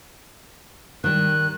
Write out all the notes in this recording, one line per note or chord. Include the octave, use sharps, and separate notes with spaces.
D#3 G3 F#6